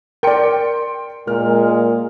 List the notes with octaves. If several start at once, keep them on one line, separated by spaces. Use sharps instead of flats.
A#4 D5 G5 C6 C#7
A#2 G#3 A#4 F6